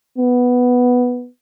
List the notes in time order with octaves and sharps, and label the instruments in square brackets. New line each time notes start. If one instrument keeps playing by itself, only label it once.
[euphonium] B3